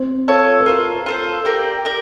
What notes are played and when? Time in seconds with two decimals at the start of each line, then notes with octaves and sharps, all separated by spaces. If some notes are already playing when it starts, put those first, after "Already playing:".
Already playing: C4 C5
0.28 F4 A4 C#5
0.60 B4
0.66 F4 A4 A#4 C5
1.06 F4 A4 C5
1.45 G4 A#4 D5 G5
1.85 G4 A#4 D5